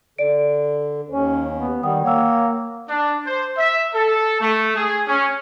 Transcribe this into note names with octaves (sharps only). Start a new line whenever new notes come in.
D3 D5 D7
D#2 C#4 C5 C#5
B3
D#3 G3 F#5 G5 D#6
A#3 C#5 F#5 G5 E6
D4
C5
E5
A4
A3
G#4
C#4